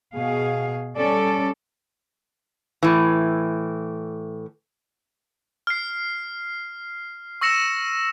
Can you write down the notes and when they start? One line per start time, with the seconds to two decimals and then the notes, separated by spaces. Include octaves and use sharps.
0.15 B2 G#4 F5
0.98 G3 C#4 A4 D5
2.83 A2 E3
5.67 F6 C7
7.41 C#6 E6 A#6 C#7 E7